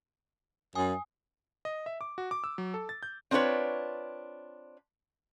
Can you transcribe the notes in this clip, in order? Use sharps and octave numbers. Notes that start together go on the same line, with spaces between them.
F#2 G#5 D#6
D#5
E5
D6
F#4
D6
E6
F#3
A4
A6
G6
C4 D4 F4 B4 C#5